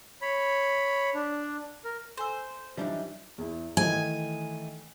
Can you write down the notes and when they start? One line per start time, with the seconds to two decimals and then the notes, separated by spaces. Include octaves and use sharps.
0.22 C#5 B5
1.14 D4
1.84 A#4
2.17 A4 C5 G#5 E6
2.77 F#2 E3 F3 G3 D4 D#4
3.38 E2 E4
3.77 D#3 E3 A3 G#5